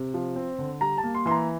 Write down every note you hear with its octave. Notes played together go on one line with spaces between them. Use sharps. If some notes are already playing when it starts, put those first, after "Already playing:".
Already playing: C3
F3
C4
D3
G3 A#5
A5
A#3
C6
E3 C6
A#5